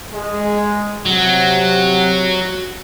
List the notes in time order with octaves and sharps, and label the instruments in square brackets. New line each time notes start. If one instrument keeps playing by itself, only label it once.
[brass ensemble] G#3
[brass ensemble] C3 F#5 [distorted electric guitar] F#3